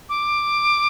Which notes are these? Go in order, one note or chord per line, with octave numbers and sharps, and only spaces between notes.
D6